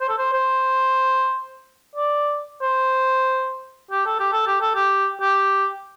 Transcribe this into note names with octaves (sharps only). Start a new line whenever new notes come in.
C5
A4
C5
C5
D5
C5
G4
A4
G4
A4
G4
A4
G4
G4